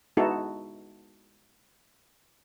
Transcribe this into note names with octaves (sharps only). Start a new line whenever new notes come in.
G#3 B3 D#4 E4 F#4 A4